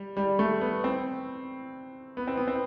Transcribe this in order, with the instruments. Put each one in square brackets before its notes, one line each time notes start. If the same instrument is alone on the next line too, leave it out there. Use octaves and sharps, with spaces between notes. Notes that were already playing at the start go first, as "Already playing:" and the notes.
Already playing: [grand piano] G3
G3
A3
B3
C4
B3
C4
B3
C4